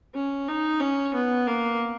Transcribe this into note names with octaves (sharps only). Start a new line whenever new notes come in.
C#4
D#4
C#4
B3
A#3